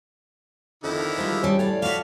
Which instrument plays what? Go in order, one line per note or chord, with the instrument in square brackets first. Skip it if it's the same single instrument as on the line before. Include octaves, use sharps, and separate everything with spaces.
[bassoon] F2 [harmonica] D3 D#3 E4
[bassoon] F3 [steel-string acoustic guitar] G3 G#3
[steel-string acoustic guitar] G3 D4 [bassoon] C#4
[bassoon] A2 [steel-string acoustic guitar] C#5 D5 F5
[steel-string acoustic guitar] F3 E5 [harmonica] F#4 D5 F5